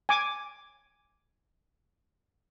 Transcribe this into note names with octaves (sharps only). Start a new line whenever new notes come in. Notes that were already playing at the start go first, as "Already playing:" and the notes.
G#5 D6